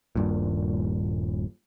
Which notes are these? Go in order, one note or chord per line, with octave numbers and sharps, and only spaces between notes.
D#1 G2 A#2